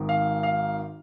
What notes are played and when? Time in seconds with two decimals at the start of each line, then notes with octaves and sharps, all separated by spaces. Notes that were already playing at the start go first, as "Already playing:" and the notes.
Already playing: G#1 G#2 D#3
0.09 F5
0.43 F5